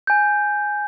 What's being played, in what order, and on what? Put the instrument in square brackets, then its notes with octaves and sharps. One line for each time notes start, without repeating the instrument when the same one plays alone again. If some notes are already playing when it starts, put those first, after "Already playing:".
[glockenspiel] G#5 G6